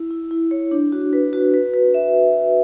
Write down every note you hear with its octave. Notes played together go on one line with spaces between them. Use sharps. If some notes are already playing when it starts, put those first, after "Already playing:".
Already playing: E4
E4
E4
C#5
D4
F#4
B4
F#4
B4
B4
E5